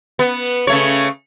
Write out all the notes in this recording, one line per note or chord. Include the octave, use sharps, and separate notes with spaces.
B3
C#3 A3 C#5